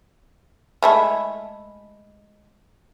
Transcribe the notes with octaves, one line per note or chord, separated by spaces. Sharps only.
G#3 A3 E4